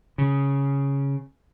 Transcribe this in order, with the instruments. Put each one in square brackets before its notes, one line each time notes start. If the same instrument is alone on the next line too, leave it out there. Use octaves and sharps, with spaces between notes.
[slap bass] C#3